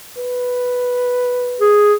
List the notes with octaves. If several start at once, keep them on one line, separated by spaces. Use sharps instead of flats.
B4
G#4